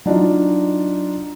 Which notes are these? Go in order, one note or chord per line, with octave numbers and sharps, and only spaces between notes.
F#3 D4 D#4 F4